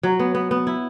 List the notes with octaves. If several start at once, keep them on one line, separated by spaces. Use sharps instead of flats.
F#3
B3
B3
B3
E4